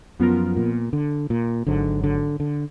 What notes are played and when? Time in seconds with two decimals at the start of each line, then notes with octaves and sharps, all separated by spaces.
0.19 F#2 F3 B3 F4 A#4
0.57 A#2
0.93 D3
1.30 A#2
1.67 G#1 G#2 D3 F#3
2.04 D3
2.40 D3